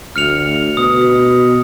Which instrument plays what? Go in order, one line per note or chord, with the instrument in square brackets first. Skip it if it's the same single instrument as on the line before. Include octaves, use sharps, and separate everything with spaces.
[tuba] D2 [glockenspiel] F6 C#7 F7
[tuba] B2 [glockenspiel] D#6